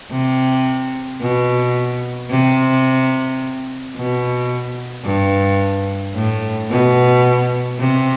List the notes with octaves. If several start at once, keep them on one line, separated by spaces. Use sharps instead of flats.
C3
B2
C3
B2
G2
A2
B2
C3